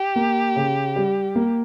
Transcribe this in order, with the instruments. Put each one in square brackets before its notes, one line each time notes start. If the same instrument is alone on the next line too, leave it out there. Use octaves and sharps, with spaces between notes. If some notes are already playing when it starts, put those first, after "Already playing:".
Already playing: [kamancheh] G4
[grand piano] A#3
C#3
G3
A#3